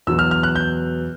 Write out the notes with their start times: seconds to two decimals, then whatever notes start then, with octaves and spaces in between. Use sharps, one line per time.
0.07 E2 B2 F#3 B3 E6
0.19 F6
0.31 F6
0.43 F#6
0.55 G6